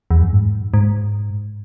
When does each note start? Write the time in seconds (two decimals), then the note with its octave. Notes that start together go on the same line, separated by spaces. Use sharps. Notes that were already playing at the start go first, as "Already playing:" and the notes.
0.11 E2
0.22 F#2
0.33 G#2
0.74 G#2